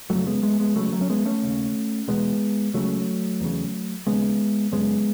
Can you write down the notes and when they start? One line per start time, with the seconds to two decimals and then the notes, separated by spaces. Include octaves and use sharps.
0.10 F#2 C#3 F#3 A3
0.26 G#3 B3
0.43 G#3 B3
0.60 G#3 B3
0.76 C#2 C#3 F#3 A3
0.92 F#3 A3
1.01 C#4
1.10 G#3 B3
1.25 A3 C#4
1.42 D#2 C#3
2.08 E2 B2 G#3 B3
2.74 C#2 C#3 F#3 A3
3.40 E2 C#3
4.07 D#2 C#3 G#3 B3
4.72 F#2 C#3 G#3 B3